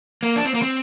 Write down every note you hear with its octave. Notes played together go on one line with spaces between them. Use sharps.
A#3
D4
C4
A#3
C4